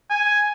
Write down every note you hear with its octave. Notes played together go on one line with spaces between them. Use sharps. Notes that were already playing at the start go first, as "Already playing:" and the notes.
G#5